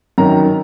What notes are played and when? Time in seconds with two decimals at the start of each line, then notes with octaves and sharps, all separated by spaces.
0.18 F#2 D#3 A#5